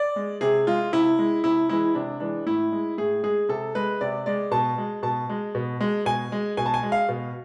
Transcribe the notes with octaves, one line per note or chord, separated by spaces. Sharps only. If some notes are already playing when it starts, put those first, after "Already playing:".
Already playing: D5
G#3
C3 G#4
G#3 F4
C3 E4
G#3
C3 E4
E3 G#3 E4
C3 D4
E3 G#3 D4
A2 E4
G#3
A2 G#4
G#3 G#4
C3 A4
G#3 B4
C3 D5
G#3 D5
B2 A5
G#3
B2 A5
G#3
B2
G#3
B2 G#5
G#3
B2 G#5
A5
G#5
G#3
F5
B2